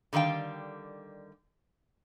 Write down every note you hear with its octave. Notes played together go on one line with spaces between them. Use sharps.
D3 D#3 G3 F5 G5